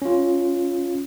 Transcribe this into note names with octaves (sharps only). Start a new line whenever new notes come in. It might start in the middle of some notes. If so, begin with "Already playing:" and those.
C#4 F4